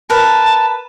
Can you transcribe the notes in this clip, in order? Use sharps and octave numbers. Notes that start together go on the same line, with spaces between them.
A#4 B4 A5